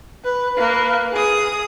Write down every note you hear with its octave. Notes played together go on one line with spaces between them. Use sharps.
B4
A#3 B4
G#4 D#6